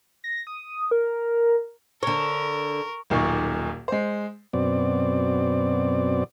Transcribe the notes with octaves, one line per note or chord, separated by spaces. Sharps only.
A#6
D#6
A#4
D3 A#4 C#5 C#6
D#1 B1 A#2 D#4 C#6
G#3 C5
F#2 B2 C4 D5